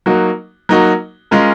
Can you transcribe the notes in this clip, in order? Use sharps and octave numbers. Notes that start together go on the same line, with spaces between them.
F#3 A#3 D#4 F#4
F#3 A#3 D#4 F#4
G#3 C#4 F4 A#4